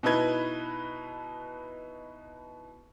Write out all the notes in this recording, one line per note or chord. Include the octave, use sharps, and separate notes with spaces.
B2 D#4 E4 B4 G#6